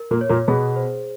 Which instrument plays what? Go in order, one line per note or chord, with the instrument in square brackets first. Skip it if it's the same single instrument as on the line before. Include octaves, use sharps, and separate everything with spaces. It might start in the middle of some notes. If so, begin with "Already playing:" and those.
Already playing: [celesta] A#4
[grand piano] A#2 A#3
[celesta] C#5
[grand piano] A#2 A#3
[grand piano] B2 B3 [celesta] G#4
[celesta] C5